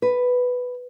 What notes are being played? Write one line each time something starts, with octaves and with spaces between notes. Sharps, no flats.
B4